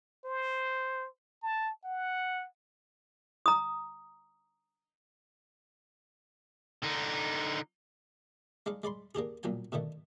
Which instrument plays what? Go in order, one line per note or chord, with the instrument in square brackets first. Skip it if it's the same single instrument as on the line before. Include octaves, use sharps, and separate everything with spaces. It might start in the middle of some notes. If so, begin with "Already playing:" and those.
[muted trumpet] C5
A5
F#5
[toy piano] A#5 D#6
[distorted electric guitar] D3 D#4
[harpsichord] G#3 D4 D#4 F5
G#3 D5 B5 C6
A#3 D4 G4 G#4
B1 A#2 F#3 G5 G#5
B2 D3 D#3 A3